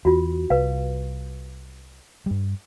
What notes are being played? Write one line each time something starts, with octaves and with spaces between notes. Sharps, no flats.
E2 F4 F#4
C2 B4 F5
G2 G3